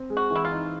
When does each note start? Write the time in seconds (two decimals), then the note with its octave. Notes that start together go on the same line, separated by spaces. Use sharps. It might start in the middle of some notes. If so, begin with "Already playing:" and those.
Already playing: C4
0.10 G#3
0.17 F#4
0.30 E3
0.35 E4
0.45 F4
0.52 D#4